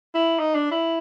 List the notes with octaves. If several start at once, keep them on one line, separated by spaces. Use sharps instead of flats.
E4
D#4
D4
E4